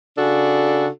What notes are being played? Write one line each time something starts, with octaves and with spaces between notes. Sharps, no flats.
C#3 D4 F#4 A4